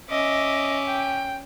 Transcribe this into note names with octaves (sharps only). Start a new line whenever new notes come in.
C#4 D#5 E5 D6
G5